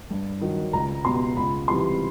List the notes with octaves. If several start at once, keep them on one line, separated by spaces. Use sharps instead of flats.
G2
D#3 F#3
C#2 A#5
B2 G3 C6
C#2 B5
C3 E3 G3 C6